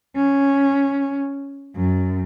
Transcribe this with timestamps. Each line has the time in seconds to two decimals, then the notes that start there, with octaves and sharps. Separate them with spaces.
0.16 C#4
1.76 F#2